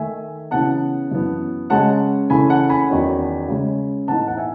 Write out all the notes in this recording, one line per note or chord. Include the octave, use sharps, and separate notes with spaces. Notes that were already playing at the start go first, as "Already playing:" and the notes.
Already playing: D#3 A3 D#4 E5 G#5
C#3 E3 B3 F#5 A5
F#2 E3 B3
C#3 G#3 C#4 F#5 A5
C#3 E3 A3 G#5 B5
F#5 A5
G#5 B5
E2 D#3 F#3 C#4
C#3 G#3 C#4
A2 E3 B3 D#4 F#5 A5
F#5
E5 G#5